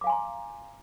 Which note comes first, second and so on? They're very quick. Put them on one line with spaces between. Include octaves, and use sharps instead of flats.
D6 F5 G#5 C6 A#5